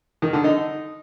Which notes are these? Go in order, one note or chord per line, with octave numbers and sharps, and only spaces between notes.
D#3
D3
D#4